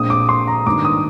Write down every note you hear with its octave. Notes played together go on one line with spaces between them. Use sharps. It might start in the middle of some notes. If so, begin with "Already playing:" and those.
Already playing: A#1 A#2 G#3 C4 D#6
D6
C6
A#5
G#1 G2 D#3 A#3 D6
D#6